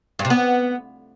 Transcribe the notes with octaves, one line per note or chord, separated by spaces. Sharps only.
G2
C3
B3